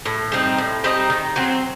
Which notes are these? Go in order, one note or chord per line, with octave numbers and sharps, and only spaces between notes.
A2
G3 C4 D#4
A2
G3 C4 D#4
D#3
F#3 C4